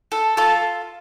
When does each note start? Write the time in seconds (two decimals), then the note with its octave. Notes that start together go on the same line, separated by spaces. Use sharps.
0.12 A4
0.37 F4 A4